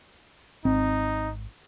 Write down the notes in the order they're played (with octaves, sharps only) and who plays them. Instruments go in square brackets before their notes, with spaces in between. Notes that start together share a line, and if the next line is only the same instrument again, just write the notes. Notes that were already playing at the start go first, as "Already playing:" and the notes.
[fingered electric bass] G#1 [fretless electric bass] C4 [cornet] D#4